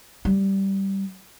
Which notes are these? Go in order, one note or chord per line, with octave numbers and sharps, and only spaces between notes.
G3